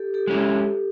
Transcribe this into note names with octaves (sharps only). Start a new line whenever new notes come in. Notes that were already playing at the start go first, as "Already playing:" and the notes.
Already playing: G4 A4
G4 A4
G#3 C#4 E4